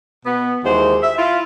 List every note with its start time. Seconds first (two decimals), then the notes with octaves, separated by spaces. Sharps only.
0.25 B2 B3
0.64 D#2 E3 G#3 F#4 C5
1.03 E5
1.17 E4 F4